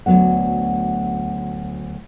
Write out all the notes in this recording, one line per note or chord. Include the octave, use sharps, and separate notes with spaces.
D2 G#2 F#3 B3 F#5